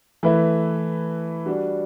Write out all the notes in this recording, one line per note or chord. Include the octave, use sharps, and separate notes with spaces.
E3 A3 E4 B4 E5
G3 D4 F#4